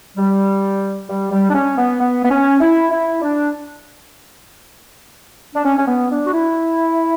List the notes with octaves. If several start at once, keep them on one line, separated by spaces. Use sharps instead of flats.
G3
G3
G3
D4
C#4
B3
B3
B3
C#4
E4
E4
D4
D4
C#4
C#4
B3
D4
F#4
E4